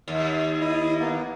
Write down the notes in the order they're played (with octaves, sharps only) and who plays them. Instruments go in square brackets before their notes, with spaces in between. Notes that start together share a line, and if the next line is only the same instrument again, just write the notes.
[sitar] D#2
[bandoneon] E4 D#5 D#6
A#3 B3